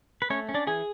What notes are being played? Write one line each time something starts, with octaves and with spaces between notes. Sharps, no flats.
B4
A3 C#4 C#5
C#4
D4 D5
E3 G#4 G#5